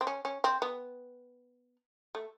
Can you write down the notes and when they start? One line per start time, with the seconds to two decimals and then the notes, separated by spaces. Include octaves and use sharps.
0.01 C4
0.07 C#4
0.25 C#4
0.44 C4
0.62 B3
2.15 A3